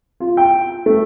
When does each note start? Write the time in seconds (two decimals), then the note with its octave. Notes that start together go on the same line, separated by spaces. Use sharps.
0.20 F4
0.37 G5
0.86 A3